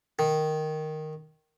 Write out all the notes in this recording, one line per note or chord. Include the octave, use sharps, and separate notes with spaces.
D#3